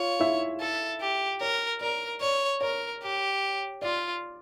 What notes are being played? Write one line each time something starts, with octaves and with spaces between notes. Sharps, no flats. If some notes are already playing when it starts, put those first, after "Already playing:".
Already playing: F4 C#5 F5
E4 E5
A4
G4
A#4 C#5
A#4 D5
C#5 D5
A#4 C#5
G4
F4 D5